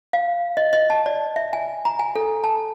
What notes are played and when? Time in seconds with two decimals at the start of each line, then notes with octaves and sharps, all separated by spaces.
0.13 F5
0.57 D#5
0.73 D#5
0.90 A5
1.06 D5
1.36 E5
1.53 G#5
1.85 A#5
1.99 G#5
2.16 A4
2.44 A5